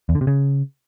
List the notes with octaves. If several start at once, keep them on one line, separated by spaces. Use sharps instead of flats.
E2
D3
C3
C#3